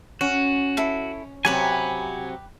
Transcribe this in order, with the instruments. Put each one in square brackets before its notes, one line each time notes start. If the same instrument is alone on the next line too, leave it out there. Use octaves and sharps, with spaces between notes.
[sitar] C#4 [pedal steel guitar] F#4 [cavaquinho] F#5
[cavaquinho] E4 A4
[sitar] C3 F#3 [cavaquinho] G4 B4 B5 [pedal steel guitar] F#5 G#5